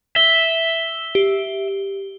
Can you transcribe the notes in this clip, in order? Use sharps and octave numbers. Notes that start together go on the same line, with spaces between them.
E5 G7
G4